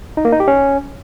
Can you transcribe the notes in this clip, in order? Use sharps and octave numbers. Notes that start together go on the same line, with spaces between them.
D#4
A#3
D#4
G4
C#4